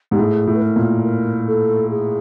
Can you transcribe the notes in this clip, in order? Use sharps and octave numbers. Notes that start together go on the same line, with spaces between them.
G#2 G4
A2 G#4
A2
B4
A#4
A#2
A#4
A4
G#4